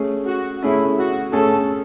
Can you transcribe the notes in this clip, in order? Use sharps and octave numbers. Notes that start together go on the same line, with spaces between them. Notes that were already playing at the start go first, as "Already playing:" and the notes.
Already playing: A3 C#4 G#4
F#4
A3 C#4 E4 G#4
F#4
A3 C#4 G#4 A4